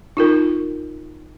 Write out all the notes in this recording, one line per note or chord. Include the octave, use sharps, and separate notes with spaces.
D#4 F4 A#4